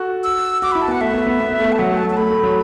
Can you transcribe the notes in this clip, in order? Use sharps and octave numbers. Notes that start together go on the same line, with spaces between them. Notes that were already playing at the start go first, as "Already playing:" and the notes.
Already playing: F#4 A4
E6
F#4 D6
E4 B5
A5
B3 F#5
A3 E5
B3
B3
B3
B3
A3
A5
F#3 F#5
A3
A5
F#3
A5
A3 B5
A3
F#3